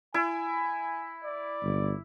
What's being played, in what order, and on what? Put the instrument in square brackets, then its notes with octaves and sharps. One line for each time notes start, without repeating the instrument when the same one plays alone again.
[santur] E4 [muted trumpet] G#5
[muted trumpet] D5
[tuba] G1